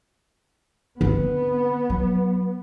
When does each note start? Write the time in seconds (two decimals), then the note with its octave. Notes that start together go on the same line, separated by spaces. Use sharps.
1.01 D3 B3 C4
1.90 F#3